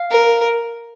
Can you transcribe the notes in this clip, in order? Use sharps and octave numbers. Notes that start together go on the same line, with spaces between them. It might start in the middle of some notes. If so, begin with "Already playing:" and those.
Already playing: F5
A#4